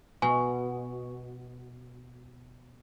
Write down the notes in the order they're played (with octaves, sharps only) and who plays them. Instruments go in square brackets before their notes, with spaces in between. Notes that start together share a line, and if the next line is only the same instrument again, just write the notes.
[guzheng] B2 [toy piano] G#5